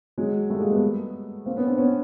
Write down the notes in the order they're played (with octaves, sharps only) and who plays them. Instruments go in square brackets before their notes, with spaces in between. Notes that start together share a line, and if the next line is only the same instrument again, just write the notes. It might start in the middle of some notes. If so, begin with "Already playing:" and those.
[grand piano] F#3 G#3
G3 A3
G#3 A#3
A3 B3
A#3 C4
B3 C#4
C4 D4
B3 C#4